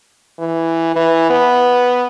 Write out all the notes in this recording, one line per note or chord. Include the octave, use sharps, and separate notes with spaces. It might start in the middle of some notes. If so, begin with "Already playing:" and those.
E3
E3
B3